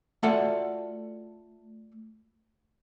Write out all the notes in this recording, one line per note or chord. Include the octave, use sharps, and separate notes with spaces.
A3 F4 F#4 A4 D5 F#5